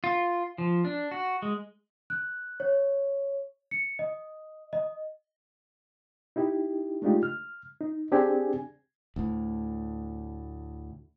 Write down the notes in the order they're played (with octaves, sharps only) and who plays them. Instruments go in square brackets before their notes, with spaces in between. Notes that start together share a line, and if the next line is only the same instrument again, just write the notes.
[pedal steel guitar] F4
F3
D4
F#4
G#3
[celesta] F#6
C#5
C#7
D#5
D#5
[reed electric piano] D#4 E4 G4
G#3 A3 D4 D#4 F4 G4
F6
D#4
C4 D4 G4 G#4 D5 G#5
[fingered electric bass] D2 A2